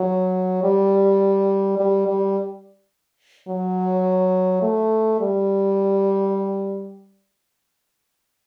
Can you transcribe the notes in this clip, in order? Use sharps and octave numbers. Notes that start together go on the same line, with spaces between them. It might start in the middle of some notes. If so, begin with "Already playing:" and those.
Already playing: F#3
G3
G3
G3
F#3
A3
G3